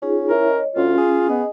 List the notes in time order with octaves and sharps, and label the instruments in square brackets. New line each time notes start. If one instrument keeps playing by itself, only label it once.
[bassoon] C#4 [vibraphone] D#4 F4 G#4
[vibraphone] E4 C#5 E5 [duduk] A#4
[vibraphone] C#5 D#5
[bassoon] D2 [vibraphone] C#4 [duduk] F4
[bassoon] G#4
[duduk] B3 [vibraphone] D#5